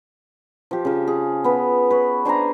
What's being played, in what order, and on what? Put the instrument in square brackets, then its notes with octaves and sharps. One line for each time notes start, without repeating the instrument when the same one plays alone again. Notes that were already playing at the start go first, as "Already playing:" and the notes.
[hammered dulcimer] F3 G4
C#3 F3
G#4
B3 B4
B4 C#5
D4 C5 G#5 A#5